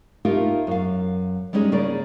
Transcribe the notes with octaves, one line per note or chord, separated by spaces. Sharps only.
A3 A#3 D#4 F4 G4 A#4
F#2 F5
G3 G#3 C#4 D#4 F#4 G#4
C#3 A#3 C#4 G#4 D5